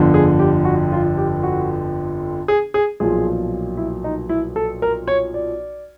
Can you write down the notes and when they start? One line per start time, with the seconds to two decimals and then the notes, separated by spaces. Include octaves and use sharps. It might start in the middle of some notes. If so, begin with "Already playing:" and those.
Already playing: G1 F2 D3 F3
0.14 G#4
0.39 G4
0.65 F#4
0.92 F4
1.17 G4
1.43 F#4
2.48 G#4
2.74 G#4
3.00 B1 A#2 F3 G#4
3.77 E4
4.04 D#4
4.29 E4
4.56 A4
4.82 A#4
5.08 C#5
5.34 D5